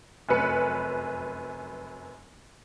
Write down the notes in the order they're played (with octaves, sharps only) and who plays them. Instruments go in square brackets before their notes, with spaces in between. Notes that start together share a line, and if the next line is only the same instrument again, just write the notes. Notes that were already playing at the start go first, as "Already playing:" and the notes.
[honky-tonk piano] F1 F#2 B4 C#7